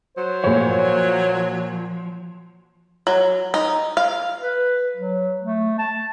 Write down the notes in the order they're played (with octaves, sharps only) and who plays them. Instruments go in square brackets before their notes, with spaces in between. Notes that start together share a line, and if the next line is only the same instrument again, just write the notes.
[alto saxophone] F#3 [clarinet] C5
[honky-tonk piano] A#2 C#5 [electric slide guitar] F3
[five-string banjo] F#3
D#4
F5
[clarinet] B4
F#3
A3
A5